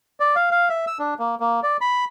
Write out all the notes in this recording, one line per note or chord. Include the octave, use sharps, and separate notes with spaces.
D5
F5
F5
E5
E6
D4
A#3
A#3
D5
B5